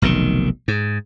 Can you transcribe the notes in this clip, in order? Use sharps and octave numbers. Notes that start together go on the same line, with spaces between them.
F1 B1 C3 D#3
G#2